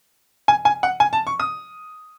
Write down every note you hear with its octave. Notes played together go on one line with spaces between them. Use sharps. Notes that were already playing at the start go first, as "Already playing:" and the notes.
G#5
G#5
F#5
G#5
A5
C#6
D#6